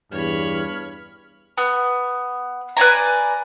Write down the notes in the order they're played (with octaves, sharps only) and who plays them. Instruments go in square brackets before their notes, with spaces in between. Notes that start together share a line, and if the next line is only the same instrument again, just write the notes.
[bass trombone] E2 [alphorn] G2 [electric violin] C#5 B5 [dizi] F6
[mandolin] B3
B4 D5 G#5 A#5